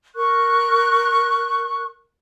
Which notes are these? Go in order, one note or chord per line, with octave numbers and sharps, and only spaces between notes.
A#4 C#6 F#6